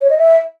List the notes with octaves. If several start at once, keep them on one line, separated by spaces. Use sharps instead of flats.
C#5
D#5
E5